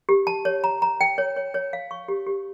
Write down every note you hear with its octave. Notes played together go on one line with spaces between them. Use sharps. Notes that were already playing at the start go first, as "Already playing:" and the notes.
G4
A5
C#5
A#5
A#5
G5
C#5
C#5
C#5
F5
C#6
G4
G4